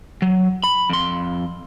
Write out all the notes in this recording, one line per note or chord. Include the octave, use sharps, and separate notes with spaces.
F#3
B5
F2 C6